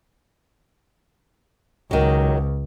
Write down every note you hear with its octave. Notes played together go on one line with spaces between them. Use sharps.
C#2 D#3 F#3